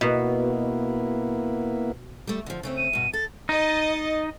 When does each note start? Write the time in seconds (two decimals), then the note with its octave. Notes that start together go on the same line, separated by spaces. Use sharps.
0.01 B2 A#3 B3 E4
2.27 G3 A3
2.46 D3 F3
2.63 C#3 A3 C4
2.77 D#7
2.93 G2 B2
3.13 A4 A6
3.49 D#4 D#5 A6